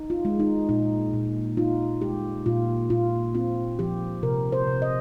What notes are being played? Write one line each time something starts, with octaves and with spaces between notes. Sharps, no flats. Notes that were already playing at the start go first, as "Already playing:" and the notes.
Already playing: D#4
F4
G#3
D#4
A#2 D#4
A#2
D#4 F4
G#3 G4
A#2 F4
A#2 F4
C4 F4
F3 G4
C3 A#4
C5
C3
D#5